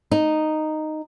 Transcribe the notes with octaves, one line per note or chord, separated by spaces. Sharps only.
D#4